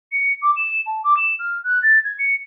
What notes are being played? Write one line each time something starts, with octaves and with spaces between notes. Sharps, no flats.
C#7
D6
E7
A5
D6
E7
F6
F#6
A6
G#6
C#7